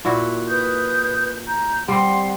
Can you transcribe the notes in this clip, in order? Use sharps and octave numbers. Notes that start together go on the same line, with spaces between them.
A#2 E4 F#4
B4 D#6 G6
A#5 G6
G3 C4 F#5 C6